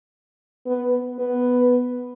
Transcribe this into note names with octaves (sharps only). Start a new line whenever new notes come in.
B3
B3